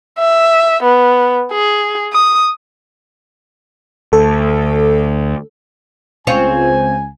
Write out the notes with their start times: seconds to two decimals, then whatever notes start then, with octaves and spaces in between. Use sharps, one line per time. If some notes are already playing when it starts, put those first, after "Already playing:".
0.19 E5
0.83 B3
1.52 G#4
2.13 D#6
4.13 D2 A4
6.27 C#2 C4 F4 C#5 G#5